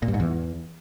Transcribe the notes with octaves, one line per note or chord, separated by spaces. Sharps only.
A#2
G2
G#2
E2